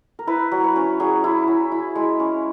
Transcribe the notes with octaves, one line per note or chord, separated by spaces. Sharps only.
A#4
E4 B4
F#3
B4
C#4
F#3 G#4
E4
F#3
E4
G#3
C#4